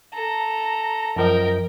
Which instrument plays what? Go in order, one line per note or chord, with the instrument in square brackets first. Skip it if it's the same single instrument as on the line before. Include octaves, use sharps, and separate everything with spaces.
[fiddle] A4 A#5
[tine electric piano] F#2 F3 D#5 [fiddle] A#4 G5